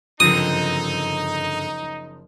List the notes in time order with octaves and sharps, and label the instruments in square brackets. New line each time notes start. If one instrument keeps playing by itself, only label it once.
[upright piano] F#1 F3 [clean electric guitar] G2 D3 C4 [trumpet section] D#4 [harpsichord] D#6